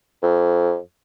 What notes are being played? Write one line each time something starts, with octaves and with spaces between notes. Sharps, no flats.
F2